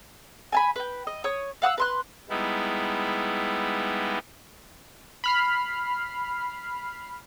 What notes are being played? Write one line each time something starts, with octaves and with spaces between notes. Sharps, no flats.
G#5 A5 B5
B4 G5
D#5
C#5 C#6 D#6
F5 F#5 D#6 E6
B4 C6 F#6
G3 G#3 B3 D#4 E4
B5 F6 C7